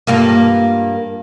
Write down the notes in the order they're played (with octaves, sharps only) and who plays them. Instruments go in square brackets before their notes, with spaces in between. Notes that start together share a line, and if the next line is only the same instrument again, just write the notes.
[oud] G2 A#3 F4